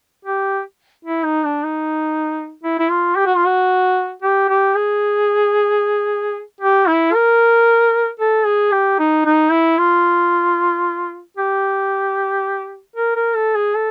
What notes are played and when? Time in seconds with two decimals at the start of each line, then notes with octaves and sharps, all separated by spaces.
0.25 G4
1.05 E4
1.25 D#4
1.44 D4
1.64 D#4
2.63 E4
2.79 E4
2.90 F4
3.16 G4
3.26 F#4
3.36 F4
3.46 F#4
4.22 G4
4.49 G4
4.75 G#4
6.61 G4
6.88 E4
7.14 A#4
8.20 A4
8.46 G#4
8.72 G4
8.99 D#4
9.25 D#4
9.51 E4
9.78 F4
11.37 G4
12.96 A#4
13.16 A#4
13.35 A4
13.55 G#4
13.75 A4